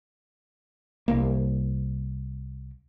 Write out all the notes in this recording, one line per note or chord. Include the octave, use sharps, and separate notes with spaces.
C2 A#3